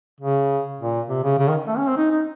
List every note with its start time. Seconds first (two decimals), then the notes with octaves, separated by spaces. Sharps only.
0.20 C#3
0.79 A#2
1.09 C3
1.24 C#3
1.38 C#3
1.48 D#3
1.67 A3
1.77 C#4
1.87 C4
1.97 D#4
2.11 D#4